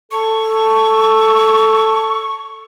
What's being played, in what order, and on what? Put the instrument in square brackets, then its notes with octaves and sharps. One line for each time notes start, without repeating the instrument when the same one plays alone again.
[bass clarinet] A4 [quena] C#6